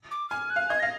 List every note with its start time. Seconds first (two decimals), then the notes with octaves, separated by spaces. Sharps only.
0.11 D6
0.30 G#5 F6
0.50 F#6
0.56 F5
0.70 D#5 G#6
0.80 F5 A#6